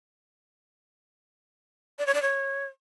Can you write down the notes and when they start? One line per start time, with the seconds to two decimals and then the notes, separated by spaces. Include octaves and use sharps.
1.99 D5
2.07 C#5
2.14 D5
2.22 C#5